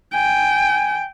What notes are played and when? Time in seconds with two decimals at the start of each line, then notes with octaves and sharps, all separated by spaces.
0.14 G5 G#5